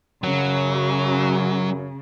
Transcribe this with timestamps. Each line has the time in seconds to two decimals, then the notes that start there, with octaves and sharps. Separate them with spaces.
0.24 F#2 C#3 F#3